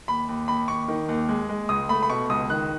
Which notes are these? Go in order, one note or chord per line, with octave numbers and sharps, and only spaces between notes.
D#2 B5
D#2
D#2 B5
D#2 C#6
D#3
D#2
G#3
G#3
C#2 D#6
A3 B5
B5
B2 C#6
C#2 D#6
D#3 F#6